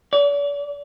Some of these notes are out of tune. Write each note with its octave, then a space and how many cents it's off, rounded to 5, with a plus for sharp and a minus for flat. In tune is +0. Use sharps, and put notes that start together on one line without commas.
D5 -40